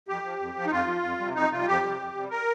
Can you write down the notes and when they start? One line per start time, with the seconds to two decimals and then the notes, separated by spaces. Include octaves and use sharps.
0.08 F2 G4
0.24 F3
0.40 F2
0.55 F3
0.66 D#4
0.71 F2 F4
0.87 F3
1.03 F2
1.19 C3 G3
1.35 F2 D#4
1.51 C3 G3 F4
1.67 F2 G4
1.83 C3 G3
1.99 F2
2.15 C3 G3
2.30 A#4